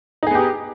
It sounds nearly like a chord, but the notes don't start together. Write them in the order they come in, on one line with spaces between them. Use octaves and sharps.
D#4 G#4 B3 G4